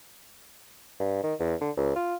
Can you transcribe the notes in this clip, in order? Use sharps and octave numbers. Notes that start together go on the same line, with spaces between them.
G2
D#3
E2
D3
C#2
F4